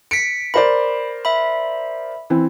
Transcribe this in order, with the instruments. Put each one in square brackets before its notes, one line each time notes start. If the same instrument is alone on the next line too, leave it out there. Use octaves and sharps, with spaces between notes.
[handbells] B6 C#7 [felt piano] D7
[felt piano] A#4 C5 D5 [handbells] B5
[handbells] E5 B5
[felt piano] E3 C4